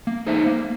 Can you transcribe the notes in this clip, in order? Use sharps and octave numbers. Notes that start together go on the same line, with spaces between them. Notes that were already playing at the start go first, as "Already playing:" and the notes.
A#3
D#4 G#4 C5 E5
A#3